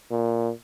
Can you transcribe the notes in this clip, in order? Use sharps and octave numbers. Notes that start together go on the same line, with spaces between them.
A#2